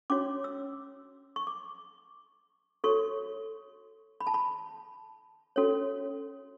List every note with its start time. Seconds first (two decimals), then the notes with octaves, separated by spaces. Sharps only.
0.10 C#4 F#4 C#5 D6
0.44 E6
1.36 C#6
1.47 D6
2.84 F#4 A4 C#5 C#6
4.20 B5
4.27 A5
4.34 B5
5.56 C#4 F#4 A4 C#5